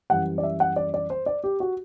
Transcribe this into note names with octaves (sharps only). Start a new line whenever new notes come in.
F#2 E3 G3 F#5
D5
E5
F#5
D5
D5
C5
D5
G4
F#4